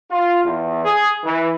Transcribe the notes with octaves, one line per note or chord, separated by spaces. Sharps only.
F4
E2
G#4
E3